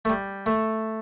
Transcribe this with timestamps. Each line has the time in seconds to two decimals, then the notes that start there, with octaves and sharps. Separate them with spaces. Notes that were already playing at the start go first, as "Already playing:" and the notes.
0.05 A3
0.10 G3
0.46 A3